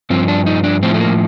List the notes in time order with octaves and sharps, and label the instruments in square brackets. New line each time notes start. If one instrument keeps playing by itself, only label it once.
[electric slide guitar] G2 F3 C4
D4
D#4
D4
A2 F3 C4
A3
A#3